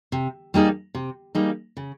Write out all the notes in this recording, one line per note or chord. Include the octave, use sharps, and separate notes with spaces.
C3
G3 A#3 D#4 G#4
C3
G3 A#3 D#4 G#4
C#3